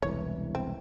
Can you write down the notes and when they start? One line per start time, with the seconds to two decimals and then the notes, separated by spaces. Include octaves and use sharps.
0.02 E1 C2 E3 C#5
0.55 C4